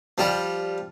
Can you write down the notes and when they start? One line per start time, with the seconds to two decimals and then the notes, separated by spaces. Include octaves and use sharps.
0.18 F3 G3